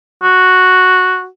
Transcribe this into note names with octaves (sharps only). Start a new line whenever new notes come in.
F#4